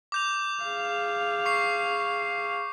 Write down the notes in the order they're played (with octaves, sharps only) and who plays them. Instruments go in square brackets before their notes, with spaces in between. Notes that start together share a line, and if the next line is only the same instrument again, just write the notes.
[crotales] D6 G6 F7
[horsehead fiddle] G#4 F5
[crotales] C#6 C7